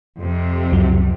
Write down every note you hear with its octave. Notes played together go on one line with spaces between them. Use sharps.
F2 C3
C#2 F#2 F#3